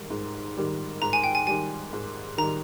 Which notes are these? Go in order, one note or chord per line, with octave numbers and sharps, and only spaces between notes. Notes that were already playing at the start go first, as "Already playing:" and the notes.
Already playing: G#2 D#3 G3
G#2
D#3 G3
G#2 A#5
G#5
G5
G#5
D#3 G3 G#5
G#2
D#3 G3 A#5